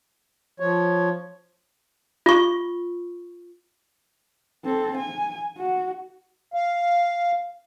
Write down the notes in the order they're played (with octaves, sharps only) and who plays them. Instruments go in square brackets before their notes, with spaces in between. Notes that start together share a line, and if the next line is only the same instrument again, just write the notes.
[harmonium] F3 C#5
[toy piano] F4 C#6
[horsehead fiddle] C4 A4
G#5
F#4
[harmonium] F5